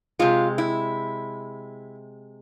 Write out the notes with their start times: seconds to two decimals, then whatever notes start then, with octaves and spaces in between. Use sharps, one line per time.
0.19 C3 G#3 F4
0.58 E4